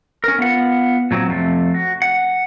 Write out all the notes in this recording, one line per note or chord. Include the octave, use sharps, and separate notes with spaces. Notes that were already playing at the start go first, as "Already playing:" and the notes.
C#4 A#4
B3 F4 F#5
A#2 F#3 C4
F2 C3 A3
F#4
F#5